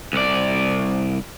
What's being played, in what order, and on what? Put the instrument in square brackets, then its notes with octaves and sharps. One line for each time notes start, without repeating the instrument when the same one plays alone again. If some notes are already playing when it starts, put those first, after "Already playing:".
[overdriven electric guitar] C2 D5